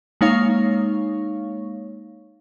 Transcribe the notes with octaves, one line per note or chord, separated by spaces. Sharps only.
G#3 A#3 D#4 C#5 F5 C#6